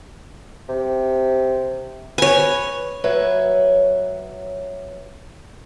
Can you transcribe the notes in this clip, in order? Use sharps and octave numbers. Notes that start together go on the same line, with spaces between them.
C3
B4 C#5 G#5
F#3 B4 C#5 E5